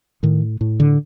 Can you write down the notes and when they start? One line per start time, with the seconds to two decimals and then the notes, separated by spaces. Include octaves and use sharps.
0.23 A2 D#3
0.61 A2
0.80 D3